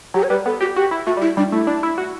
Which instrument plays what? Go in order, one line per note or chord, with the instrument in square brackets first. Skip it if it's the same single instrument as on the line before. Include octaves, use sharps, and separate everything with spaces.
[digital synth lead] F#3 [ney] G4
[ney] C#5
[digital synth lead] G3 [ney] B4
[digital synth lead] B3 [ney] A4
[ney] F#4 [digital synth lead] G4
[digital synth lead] F#4 [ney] G4
[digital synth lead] E4
[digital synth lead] A3 [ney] F#4
[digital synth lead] G3
[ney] E4
[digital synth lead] G3 [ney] D4
[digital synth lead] A3 [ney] E4
[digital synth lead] D4
E4
F#4